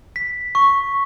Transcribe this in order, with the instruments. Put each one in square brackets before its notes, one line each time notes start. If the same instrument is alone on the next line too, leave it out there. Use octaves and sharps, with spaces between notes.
[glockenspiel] B6
C#6